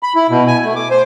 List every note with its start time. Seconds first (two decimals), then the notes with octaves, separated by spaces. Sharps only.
0.03 B5
0.15 E4
0.30 B2
0.47 G#5
0.64 A3
0.76 D6
0.91 C5